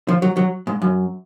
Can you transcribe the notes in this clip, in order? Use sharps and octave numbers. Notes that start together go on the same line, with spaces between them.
F3
F#3
F#3
G#2
F#2